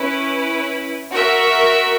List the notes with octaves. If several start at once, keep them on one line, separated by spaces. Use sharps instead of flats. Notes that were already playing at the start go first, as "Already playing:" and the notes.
Already playing: C#4 E4 B4
F#4 A#4 E5